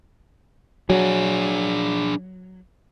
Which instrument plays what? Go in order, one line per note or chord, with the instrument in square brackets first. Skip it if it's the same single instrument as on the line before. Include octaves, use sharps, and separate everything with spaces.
[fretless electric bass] F#3 [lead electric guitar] D4 G#4